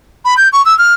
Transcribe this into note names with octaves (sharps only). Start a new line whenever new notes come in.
B5
G6
C#6
E6
F6